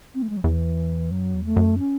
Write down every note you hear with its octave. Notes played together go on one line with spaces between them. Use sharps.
C4
A3
G#3
F#3
E2 E3
F#2 F#3
E2
A3
F#2
C#4